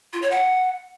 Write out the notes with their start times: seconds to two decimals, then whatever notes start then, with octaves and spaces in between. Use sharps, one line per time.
0.13 F4
0.22 C#5
0.31 F#5